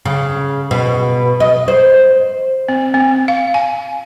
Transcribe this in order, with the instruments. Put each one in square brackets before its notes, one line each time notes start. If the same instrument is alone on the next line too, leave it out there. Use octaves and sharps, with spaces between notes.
[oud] C#3
B2
D#5
C5
[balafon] C4
C4
F5
G#5